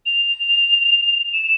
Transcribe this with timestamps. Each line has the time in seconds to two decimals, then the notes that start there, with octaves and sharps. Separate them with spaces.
0.06 F7
1.33 E7